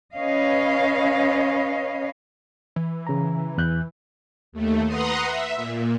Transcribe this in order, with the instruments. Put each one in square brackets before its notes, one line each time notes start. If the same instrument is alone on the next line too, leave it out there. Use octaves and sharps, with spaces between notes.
[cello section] C#4 B4 C#5 D#5 F5
[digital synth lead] E3
[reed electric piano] C#3 A#5
E2 F#6 G6
[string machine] D#2 A3
B4 F#5 A#5 C6 D#6
E5
A#2